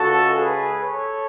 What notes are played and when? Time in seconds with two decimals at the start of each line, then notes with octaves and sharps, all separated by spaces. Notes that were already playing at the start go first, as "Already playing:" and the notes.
Already playing: C#2 C#3 G#3 F#4 A4
0.37 G#4 B4
0.82 A4 C#5